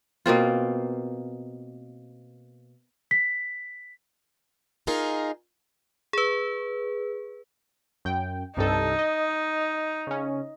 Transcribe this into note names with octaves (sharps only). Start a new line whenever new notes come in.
B2 A#3 C4 F4
B6
D#4 F4 G#4 A#4
G#4 B4
F#2 G5
C2 G2 D#4 A4
D#5
C#3 C#4